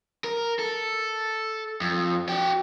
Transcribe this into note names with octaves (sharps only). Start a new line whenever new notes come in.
A#4
A4
F2
F#4 G5